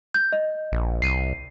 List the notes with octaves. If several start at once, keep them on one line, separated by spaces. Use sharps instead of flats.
G6
D#5
A#1
C2 C7 D#7